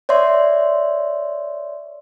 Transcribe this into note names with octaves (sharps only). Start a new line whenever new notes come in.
C#5 D5 E5 C6